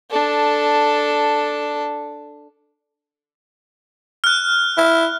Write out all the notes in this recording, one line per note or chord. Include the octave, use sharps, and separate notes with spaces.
D4 A4
F6 F#6
E4